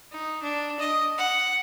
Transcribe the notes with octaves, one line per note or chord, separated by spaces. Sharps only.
D#4
D4
D#5
F#5